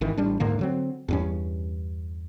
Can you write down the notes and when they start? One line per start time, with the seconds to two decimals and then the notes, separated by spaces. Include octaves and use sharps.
0.01 G#1 D#3 E3
0.17 A1 G3 D4
0.40 D2 G#2 D3 A#3
0.59 D3 F#3 C4
1.08 E2 G2 C#4